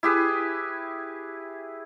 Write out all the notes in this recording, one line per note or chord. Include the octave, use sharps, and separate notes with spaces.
E4 G4 G#4 B4